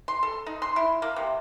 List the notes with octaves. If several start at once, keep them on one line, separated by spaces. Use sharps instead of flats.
C6
A4
D#4
C6
E4
A#3
C3